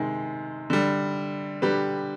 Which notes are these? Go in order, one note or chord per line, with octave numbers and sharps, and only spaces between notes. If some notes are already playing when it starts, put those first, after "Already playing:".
Already playing: C3 D#3 G#3
D3 G3
D3 G3 G4 B4